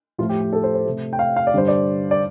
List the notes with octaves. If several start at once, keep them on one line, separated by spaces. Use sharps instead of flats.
A2 F3 A3 F4
G4
G4
A4
C5
C5
C3 A3
G5
F5
F5
D5
G2 D3 G3 C5
D5
D5